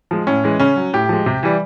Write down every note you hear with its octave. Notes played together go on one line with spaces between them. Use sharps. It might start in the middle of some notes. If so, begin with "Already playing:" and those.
F3 G#3
A2 C#4
E3 G#3
C#3 C#4
F#3
A2 G4
F3 G#3
C3
E3 G3